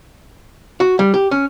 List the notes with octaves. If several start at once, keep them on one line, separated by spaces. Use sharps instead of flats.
F#4
G3
G4
C#4